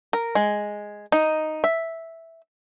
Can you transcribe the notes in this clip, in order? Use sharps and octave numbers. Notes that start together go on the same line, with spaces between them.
A#4
G#3
D#4
E5